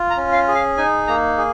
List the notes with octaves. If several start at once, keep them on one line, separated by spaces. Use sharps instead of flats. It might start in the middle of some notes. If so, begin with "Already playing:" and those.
Already playing: F4
A#5
C#4
F5
G#4
F5
D#4 G#5
A#3 A#5
G#4